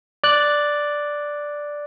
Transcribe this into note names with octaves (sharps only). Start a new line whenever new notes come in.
D5 F#6